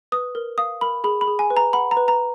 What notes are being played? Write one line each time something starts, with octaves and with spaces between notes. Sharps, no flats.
B4 D#6
A#4
F5 D#6
A#4 B5
G#4 B5
B5
G#4
G#5
B4
A#5
F#5 B5
A#5
B4
A#5